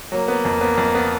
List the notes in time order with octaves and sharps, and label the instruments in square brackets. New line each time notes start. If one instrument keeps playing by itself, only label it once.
[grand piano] F#3 [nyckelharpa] A#3
[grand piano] B3
F2
B3
F2
B3